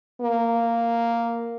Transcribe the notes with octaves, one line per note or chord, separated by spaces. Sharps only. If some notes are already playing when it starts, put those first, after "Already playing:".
A#3